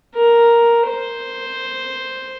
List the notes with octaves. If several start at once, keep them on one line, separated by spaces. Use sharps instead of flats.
A#4
C5